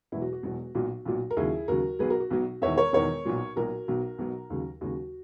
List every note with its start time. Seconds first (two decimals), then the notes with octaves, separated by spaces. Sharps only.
0.12 E1 E2 B2 F#3 E4
0.22 F#4
0.33 F#4
0.43 E1 E2 B2 F#3
0.75 B1 A#2 F#3 F#4
1.05 B1 A#2 F#3
1.31 A#4
1.37 D#2 C#3 F#3 E4 G#4
1.68 D#2 C#3 F#3 F#4 A#4
1.99 B1 B2 F#3 G#4 B4
2.10 F#4 A#4
2.20 F#4
2.30 B1 B2 F#3
2.62 E1 E2 D#3 C#5 E5
2.78 A#4 C#5
2.93 E1 E2 D#3 A#4 C#5
3.25 B1 A#2 F#3
3.56 B1 A#2 F#3 F#4 A#4
3.88 B1 B2 F#3
4.18 B1 B2 F#3
4.50 D#2 C#3 F#3
4.81 D#2 C#3 F#3 F#4